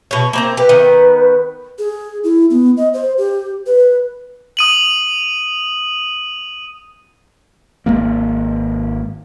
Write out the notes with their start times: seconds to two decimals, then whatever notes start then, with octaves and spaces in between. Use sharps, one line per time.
0.11 B2 C#5
0.33 A#3 C4 A#5
0.57 G4 B4
0.69 D#3 B3
1.79 G#4
2.24 E4
2.50 B3
2.77 D#5
2.94 C5
3.18 G4
3.66 B4
4.57 D#6 D#7 F#7
7.86 G#1 G2 G#3 A#3